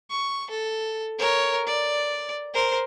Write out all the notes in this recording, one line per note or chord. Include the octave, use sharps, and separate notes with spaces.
C#6
A4
A#4 C#5
D5
A#4 C5